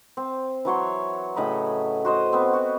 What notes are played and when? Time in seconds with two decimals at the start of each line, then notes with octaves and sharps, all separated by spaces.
0.17 C4
0.65 E3 F#3 C#5 C6
1.36 A2 C#3 D#5 B5
2.05 F#4 C5 D#5
2.33 B3 C4
2.53 F#4